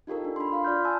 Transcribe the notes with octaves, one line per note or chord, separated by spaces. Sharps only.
D#4 F4 G4 A4 A#4
D4
B5 C6
F4 F5 B5 C6
F4 D5 F6 G6
G#5 A5 E6